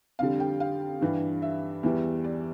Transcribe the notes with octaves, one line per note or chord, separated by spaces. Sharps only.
F2 D3 G3 F5
G5
F5
G2 E3 G3
E5
E2 E3 G3
D5